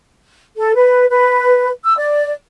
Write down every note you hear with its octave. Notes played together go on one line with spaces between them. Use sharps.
A4
B4
B4
E6
D5